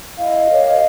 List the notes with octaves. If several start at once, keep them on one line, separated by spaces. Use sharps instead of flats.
E4 D#5 F5
G4 A#4 C#5